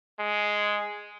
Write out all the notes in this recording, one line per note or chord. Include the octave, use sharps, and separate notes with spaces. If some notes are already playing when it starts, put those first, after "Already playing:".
G#3